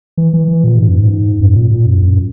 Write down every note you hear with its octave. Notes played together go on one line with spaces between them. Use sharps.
E3
E3
E3
A#2
G#2
F#2
G#2
F#2
A#2
A#2
F#2
F#2